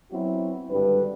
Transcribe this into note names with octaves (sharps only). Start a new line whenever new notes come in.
F#3 B3 C4 E4 F#4
G#1 G2 D3 B4